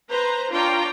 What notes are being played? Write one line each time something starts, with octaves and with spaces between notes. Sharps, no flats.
B4 C5 A#5
D4 F4 C#5 G5 A#5